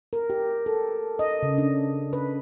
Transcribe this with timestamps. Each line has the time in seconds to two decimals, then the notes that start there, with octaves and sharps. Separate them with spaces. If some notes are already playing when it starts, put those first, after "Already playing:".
0.13 A#4
0.30 G4
0.66 A4
1.19 D#5
1.43 C#3
1.58 D4
2.13 B4